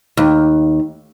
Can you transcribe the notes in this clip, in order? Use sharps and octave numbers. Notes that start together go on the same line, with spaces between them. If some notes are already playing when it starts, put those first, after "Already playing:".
D#2